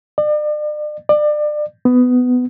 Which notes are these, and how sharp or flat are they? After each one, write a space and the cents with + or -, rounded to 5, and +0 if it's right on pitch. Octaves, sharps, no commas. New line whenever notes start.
D5 +40
D5 +30
B3 +15